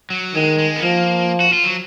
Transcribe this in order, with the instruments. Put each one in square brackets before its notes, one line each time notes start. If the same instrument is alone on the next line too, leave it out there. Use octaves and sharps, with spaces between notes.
[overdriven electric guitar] F#3
[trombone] D#3 [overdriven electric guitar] G#3
[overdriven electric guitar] G#3
B3
[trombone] F3 [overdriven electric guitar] A#3
[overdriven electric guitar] F#4
F4
F#3